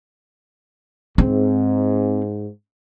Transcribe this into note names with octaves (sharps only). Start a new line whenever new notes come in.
G#2 C4